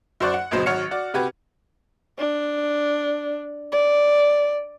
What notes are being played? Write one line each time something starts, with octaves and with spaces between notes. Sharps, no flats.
F#2 F#4 C5 D5 C#6 F#6
F#5
G1 C#2 B2 F#3 C5 D#5
G#1 F#3 C#5 F#5 F6 C#7
F#4 D5
C3 F#4 G4 B4 G#6
D4
D5